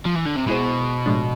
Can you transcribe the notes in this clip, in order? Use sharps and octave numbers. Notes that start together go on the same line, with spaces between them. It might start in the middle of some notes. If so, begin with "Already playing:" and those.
F3
E3
D3
C3
B2 G#3 B3 E4 G#4 C5
A2 F3 G#3 D4